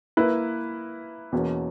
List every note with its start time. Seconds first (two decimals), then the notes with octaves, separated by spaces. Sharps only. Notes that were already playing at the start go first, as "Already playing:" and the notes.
0.17 A#3 E4 B4
1.32 E2 B2 A#3 C#4